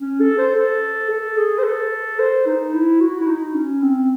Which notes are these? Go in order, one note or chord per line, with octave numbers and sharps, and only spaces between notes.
C#4
A4
C5
A4
A4
G#4
C5
A4
C5
D#4
E4
F#4
E4
D#4
C#4
C4